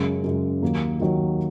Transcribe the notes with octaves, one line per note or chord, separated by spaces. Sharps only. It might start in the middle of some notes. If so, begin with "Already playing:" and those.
Already playing: F#2 C#3 G#3
F#2 C#3 G#3
D#2 D#3 F#3 A#3
D#2 D#3 F#3 A#3